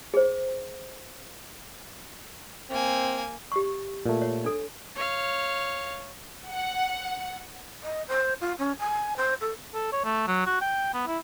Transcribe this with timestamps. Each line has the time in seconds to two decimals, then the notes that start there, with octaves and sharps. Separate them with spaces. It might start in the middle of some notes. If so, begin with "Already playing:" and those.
0.14 G#4 C5
2.70 A#3 C4 G#5
3.52 G4 C#6
4.06 A#2 A3
4.22 C#5
4.44 D4 A4
4.95 C#5 F5
6.50 F#5
7.83 D#5
8.08 C5
8.40 F4
8.58 C#4
8.79 G#5
9.16 C5
9.40 A4
9.74 A4
9.92 C#5
10.05 A3
10.27 F#3
10.47 F#4
10.61 G5
10.94 B3
11.07 E4